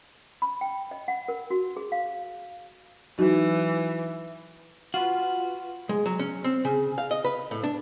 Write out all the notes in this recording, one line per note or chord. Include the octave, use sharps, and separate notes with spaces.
B5
G5
D#5
F#5
A#4
F#4
G#4
F5
E3 F#3 D#4 F#4
F4 F#4 B4
G#3
F#3
C#4
C4
C#3
F5
D#5
B4
A2
D4